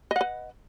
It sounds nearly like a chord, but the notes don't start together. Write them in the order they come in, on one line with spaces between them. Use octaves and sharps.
D#5 F#5 B4